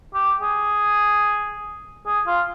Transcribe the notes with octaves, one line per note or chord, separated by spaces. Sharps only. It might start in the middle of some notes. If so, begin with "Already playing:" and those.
G4
G#4
G#4
F4